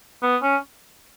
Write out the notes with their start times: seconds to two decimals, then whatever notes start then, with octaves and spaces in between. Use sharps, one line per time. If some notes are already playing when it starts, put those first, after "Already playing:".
0.23 B3
0.42 C#4